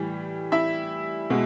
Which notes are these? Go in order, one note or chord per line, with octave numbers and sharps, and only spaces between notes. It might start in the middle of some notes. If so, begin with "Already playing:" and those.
Already playing: A2 E3 G3
E4 E5
B2 G#3